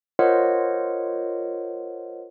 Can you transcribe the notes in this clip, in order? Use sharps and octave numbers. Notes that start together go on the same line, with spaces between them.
F4 A#4 C5 C#5 D#5 F#5